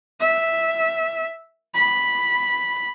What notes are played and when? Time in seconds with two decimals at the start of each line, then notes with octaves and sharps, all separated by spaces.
0.20 E5
1.74 B5